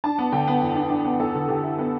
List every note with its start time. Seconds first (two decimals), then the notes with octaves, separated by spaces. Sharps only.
0.04 D4 A5
0.18 B3
0.32 D3 G5
0.47 B3
0.62 E2
0.75 D4
0.90 D4
1.05 B3
1.20 E2 A4
1.35 D3
1.48 D3 G4
1.63 E4
1.79 B3 A4